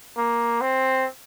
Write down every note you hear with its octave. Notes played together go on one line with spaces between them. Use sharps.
A#3
C4